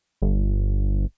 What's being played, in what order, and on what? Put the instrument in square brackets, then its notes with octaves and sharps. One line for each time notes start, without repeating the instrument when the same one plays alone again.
[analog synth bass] G1